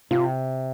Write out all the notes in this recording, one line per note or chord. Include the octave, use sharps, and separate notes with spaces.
C3 F4